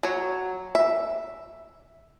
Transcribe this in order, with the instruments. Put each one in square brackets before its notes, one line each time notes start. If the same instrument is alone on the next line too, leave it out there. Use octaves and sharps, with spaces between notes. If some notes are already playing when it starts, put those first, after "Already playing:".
[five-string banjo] F#3 C#5
E5